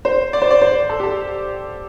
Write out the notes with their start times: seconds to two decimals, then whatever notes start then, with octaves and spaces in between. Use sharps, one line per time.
0.05 C5
0.33 D5
0.42 C5
0.51 D5
0.62 C5
0.90 A4
1.00 G4
1.03 A4